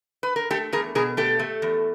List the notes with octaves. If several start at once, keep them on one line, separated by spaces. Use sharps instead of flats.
B4
A#4
A3 G4 A4
E2 G#4 A#4
B2 G#4 A#4
A3 G4 A4
A3
E2